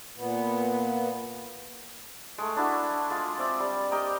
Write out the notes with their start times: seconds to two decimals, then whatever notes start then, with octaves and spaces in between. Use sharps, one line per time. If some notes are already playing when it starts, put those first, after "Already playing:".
0.16 A#2 B3
2.38 G#3 A3
2.56 D4 E4 F#4
3.10 G#3 F4
3.38 C4 D5 E5
3.60 G3
3.91 G4 A#4 D#5 G5